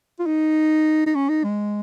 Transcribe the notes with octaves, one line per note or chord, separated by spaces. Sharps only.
F4
D#4
D#4
C#4
D#4
G#3